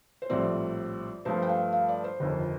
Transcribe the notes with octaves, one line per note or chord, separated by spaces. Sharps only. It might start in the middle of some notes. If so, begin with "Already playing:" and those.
C5
A#1 A2 G3 C4 D5
G2 F3 A3 C5
G5
F5
F5
D5
C5
G1 F2 D#3